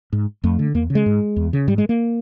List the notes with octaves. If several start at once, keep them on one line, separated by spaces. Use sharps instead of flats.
G#2
F2 A3
D3
E2 A#3
C#3
G#3
G#2
E2
C#3
G#2 G3
G#3
A#3